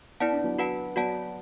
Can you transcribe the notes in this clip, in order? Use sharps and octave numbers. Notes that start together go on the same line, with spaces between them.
B3 E4 D5 F#5 A5
D4
F#3 B3
F#4 B4 F#5 A5
F#3 B3 F#4 D5 F#5 A5